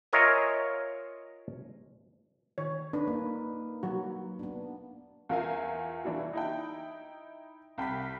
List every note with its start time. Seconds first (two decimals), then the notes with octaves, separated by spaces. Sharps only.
0.13 F4 A#4 C#5 D#5 E5 G#5
2.58 D#3 C#5
2.93 D4 D#4 B4
3.07 A#3
3.83 F#3 F#4
4.39 B3 D4
5.29 E2 F4 A#4 E5 F5 G#5
6.04 E3 D4 E4 F#4
6.33 D#4 E4 G5
7.78 C2 G5 B5 B6